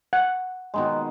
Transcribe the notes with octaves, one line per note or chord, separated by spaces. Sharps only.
F#5
B2 D#3 G#3